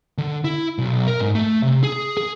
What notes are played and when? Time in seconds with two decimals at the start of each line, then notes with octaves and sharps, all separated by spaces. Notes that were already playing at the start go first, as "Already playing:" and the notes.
0.18 D3
0.44 E4
0.78 B1
1.08 A#4
1.20 G#2
1.35 A3
1.63 C3
1.83 G#4
2.17 G#4